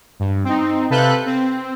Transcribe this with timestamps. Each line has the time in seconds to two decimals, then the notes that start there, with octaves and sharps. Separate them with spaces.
0.20 G2
0.44 C4 D#4
0.90 C3 A4 B4 F5 F#6 G6
1.26 C4